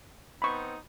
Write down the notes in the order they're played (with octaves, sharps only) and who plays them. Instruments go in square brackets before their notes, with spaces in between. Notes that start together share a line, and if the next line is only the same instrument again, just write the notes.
[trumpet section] B3 C4 D#4 [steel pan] B5 C#6